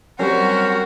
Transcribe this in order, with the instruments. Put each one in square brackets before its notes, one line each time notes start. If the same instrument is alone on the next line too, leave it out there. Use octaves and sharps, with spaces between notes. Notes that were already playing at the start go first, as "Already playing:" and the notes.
[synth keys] F#3 G3 [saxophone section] C4 A#4 [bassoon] C#4 [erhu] F#4